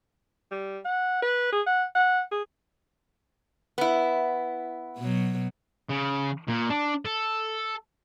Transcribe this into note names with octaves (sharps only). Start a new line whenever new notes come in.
G3
F#5
B4
G#4
F#5
F#5
G#4
B3 E4
B2 F#3
C#3
A#2
D4
A4